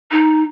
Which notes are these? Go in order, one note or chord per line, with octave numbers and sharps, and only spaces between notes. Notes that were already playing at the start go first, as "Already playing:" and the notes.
D#4